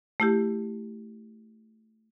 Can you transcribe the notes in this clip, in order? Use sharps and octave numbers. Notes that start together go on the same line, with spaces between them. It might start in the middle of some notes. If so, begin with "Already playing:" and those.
A3 E4 G4